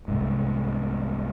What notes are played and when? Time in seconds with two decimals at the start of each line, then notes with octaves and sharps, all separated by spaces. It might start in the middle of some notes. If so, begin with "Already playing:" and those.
0.08 C2 G#2